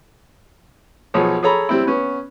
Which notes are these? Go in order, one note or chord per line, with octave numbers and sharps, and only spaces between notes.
B1 F3 G#4 C#5
G#4 A4 C#5 A#5 B5
G3 C4 E4
B3 C#4